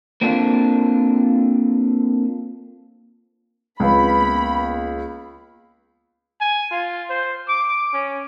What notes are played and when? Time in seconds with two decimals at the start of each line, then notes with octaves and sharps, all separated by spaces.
0.21 A#3 C4 D4 F4 A4
3.80 C#2 C4 C#4 B4 B5
4.21 A#3 B3
6.41 G#5
6.71 F4
7.10 C5
7.48 D6
7.93 C#4